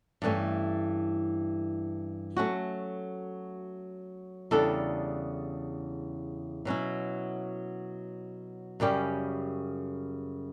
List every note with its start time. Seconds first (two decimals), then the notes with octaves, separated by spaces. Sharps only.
0.22 G2 E3 A3 C#4
2.37 F#3 A3 C#4 F#4
4.51 E2 C#3 G3 D4 A4
6.65 B2 F#3 C#4 E4
8.80 F#2 C#3 G3 C#4 G4